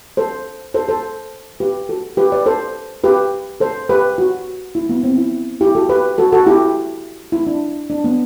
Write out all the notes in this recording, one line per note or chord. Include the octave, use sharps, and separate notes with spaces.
A4 C5
A4 C5
A4 C5
G4 B4
F#4 A4
G4 B4
B4 D5
A4 C5
G4 B4
A4 C5
G4 B4
F#4
E4
B3
C4
E4
E4 G4
F#4 A4
G4 B4
F#4 A4
F#4 A4
E4 G4
E4
D4
D4
B3